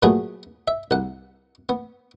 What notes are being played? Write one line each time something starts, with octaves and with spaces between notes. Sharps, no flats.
A#2 F#3 A3 B3 G#4
E5
C2 F#5
B3